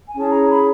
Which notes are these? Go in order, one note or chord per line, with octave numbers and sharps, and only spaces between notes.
G#5
C#4 E4 G#4 C#5 A5
A#5
B5